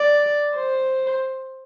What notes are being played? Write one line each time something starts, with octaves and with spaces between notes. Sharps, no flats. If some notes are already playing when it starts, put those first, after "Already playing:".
Already playing: D5
C5